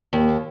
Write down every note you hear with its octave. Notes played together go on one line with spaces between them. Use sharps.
D#2